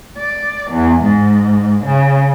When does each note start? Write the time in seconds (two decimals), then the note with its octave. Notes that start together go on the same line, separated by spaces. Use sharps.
0.19 D5
0.71 E2
1.03 G#2
1.85 C#3